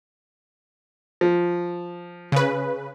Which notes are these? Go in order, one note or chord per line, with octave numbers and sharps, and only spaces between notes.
F3
C#3 B4